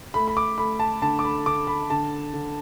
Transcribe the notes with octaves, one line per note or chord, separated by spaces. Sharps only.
A3 B5
B5
D6
A3 B5
A5
D3 A5
D6
B5
D3 D6
B5
D3 A5
D3